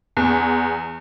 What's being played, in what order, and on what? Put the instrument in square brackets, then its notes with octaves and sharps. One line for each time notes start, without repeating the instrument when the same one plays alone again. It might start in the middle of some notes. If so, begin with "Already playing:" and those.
[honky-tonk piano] E2